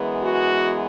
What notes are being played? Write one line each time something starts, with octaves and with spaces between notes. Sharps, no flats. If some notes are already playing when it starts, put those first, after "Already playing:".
Already playing: F#2 E3 G#3 B3
F#4